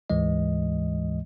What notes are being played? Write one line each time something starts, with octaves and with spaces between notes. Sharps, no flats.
D2 G#2 E3 G#3 D#5